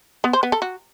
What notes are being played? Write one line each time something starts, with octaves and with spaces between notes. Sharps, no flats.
B3
C5
B3
A4
F#4